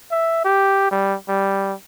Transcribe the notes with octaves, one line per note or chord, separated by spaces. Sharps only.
E5
G4
G3
G3